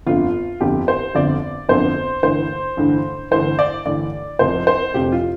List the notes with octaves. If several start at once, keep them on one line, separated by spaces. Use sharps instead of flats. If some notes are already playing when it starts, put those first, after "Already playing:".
G1 F2 D3 F4
G1 F2 D3 G4
C5
G1 F2 D3 D5
G1 F2 D3 C5
A1 G2 D3 C5
A1 G2 D3
A1 G2 D3 C5
D5
A1 G2 D3 D5
F1 F2 C3 C5
C5
F1 F2 C3 G4
F4